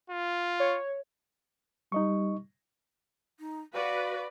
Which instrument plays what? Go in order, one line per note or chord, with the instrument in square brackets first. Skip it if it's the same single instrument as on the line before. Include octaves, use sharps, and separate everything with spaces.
[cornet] F4
[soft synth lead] C#5
[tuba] G3 [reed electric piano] D#4 D#5 C#6
[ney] D#4
[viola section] F#4 B4 [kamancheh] D5 [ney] F5